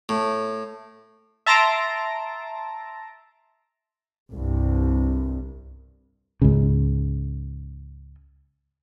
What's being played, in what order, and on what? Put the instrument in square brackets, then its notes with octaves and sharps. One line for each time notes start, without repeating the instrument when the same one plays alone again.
[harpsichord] A2
[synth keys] E5 A5 A#5 C6 A#6 D7
[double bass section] C2 G2
[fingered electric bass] C#2 G#2 C#3